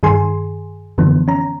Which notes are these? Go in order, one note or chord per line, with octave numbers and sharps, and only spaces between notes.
G2 D#3 G#4 G#5 C6
F#2 D3 E3 F3 B3
C#4 A#5